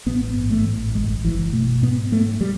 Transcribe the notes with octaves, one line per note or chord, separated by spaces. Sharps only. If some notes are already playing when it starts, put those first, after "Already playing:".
A1 B3
G#2
A3
A1
F#1 G#3
F#1 E3
B2 A3
G#2 B3
G#2 A3
G3